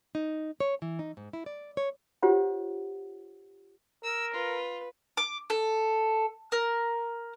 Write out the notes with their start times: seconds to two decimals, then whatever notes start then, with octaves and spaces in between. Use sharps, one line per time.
0.15 D#4
0.60 C#5
0.82 E3
0.99 D#4
1.17 G#2
1.33 E4
1.46 D5
1.77 C#5
2.22 F4 G4 C5 C#5 F#5
4.04 A#4 E6
4.34 F4 B4
5.17 D6
5.50 A4
6.52 A#4